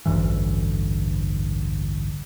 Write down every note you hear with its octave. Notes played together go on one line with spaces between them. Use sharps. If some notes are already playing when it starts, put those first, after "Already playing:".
A1 D2 G2 E3